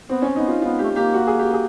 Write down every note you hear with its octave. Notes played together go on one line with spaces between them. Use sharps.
B3 C4
C#4
B3 D#4
F4
B3 F4
G4
A3
A#3
G4
F#4
G#4
G4
G#4